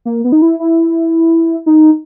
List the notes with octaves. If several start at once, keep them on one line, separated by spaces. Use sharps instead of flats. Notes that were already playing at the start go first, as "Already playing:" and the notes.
A#3
B3
D#4
E4
E4
D#4